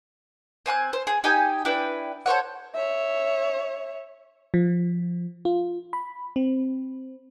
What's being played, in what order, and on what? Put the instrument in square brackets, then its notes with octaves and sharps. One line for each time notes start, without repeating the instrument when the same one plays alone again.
[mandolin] C4 G#5 C6 F#6
C5
G#4
D#4 G4 G5 G#5
D4 E4 B4 G5
A4 C5 C#5 F#5
[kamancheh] C#5 E5
[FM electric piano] F3
F4
B5
C4